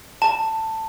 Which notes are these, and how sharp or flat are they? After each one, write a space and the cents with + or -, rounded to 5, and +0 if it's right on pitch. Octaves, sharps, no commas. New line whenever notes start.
A5 +15